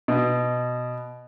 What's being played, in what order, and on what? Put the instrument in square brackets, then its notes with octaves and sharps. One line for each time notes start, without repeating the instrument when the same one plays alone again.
[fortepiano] B2